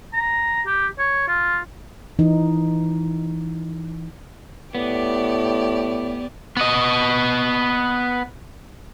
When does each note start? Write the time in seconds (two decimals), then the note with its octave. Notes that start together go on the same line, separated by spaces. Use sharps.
0.14 A#5
0.66 G4
0.99 C#5
1.28 F4
2.19 E3 D#4
4.75 A2 B3 G4 D5
6.57 B3 D#5